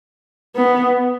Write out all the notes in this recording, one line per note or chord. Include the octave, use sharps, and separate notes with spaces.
B3